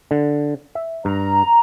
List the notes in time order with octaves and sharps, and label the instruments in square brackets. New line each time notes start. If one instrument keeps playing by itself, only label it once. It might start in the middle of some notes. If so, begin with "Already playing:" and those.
[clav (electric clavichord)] D3
E5
[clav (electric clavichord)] G2 [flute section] A#5